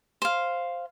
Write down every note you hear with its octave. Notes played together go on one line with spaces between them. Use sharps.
C5 F5